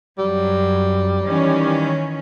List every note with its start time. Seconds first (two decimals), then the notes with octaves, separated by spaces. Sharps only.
0.19 F#2 F#3 G3
1.24 D#3 E3 C#4